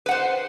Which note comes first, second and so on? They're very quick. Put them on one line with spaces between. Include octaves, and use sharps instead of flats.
B4 F#5 C5